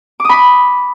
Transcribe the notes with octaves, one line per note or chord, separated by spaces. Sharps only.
B5 D6 D#6